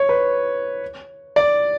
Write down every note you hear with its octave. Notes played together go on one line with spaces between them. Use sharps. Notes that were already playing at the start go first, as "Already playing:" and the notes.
Already playing: C#5
B4
D5